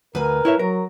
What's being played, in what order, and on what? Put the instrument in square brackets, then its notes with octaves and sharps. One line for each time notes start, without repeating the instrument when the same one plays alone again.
[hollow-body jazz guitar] D2 [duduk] A#4 [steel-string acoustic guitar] B4 G#5
[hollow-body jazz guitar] E4 C#5 E5
[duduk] F#3 [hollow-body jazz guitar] A#4